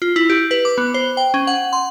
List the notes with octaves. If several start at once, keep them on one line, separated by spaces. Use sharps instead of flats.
F4
E4
G4
B4
D6
B3
C5
G5
C#4
F#5
C6